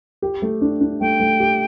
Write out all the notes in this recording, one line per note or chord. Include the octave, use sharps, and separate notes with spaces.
G4
A3
D4
D4
A3 G5
A3
G4